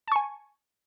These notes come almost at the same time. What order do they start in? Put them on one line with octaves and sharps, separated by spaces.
A5 C#6 G#5